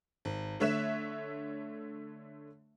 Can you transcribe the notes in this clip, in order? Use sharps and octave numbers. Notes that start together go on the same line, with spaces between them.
G#1
D3 A3 C#5 E5 F#6 E7